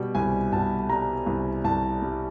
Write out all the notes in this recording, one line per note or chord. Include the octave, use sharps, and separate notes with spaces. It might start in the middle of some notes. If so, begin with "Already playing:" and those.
Already playing: B2 G3
C2 G#5
B2 A5
G3 A#5
C2
C2 A5
G3